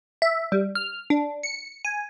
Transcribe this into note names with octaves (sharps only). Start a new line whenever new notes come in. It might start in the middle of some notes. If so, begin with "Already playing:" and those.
E5
G3
F6
D4
C#7
G#5